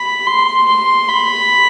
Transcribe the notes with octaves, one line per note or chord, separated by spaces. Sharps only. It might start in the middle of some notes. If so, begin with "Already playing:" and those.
Already playing: B5
C6
C6
B5